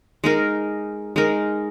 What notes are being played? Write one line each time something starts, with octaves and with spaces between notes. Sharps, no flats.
G#3 D#4 A#4
G#3 D#4 A#4